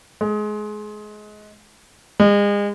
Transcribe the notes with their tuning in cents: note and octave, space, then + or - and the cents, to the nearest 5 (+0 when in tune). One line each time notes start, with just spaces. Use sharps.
G#3 +25
G#3 -35